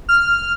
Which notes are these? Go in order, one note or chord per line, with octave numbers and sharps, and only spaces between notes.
F6